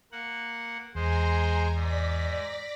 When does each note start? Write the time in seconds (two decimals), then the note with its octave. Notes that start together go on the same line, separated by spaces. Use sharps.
0.12 A#3 F#5
0.95 E2 G#3 C5 G#5 A#5 C6
1.74 G#2 D5 A#6 B6